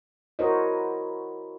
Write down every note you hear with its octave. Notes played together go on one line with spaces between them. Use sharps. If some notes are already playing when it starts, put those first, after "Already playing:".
E4 F#4 A#4 C5 C#5 D#5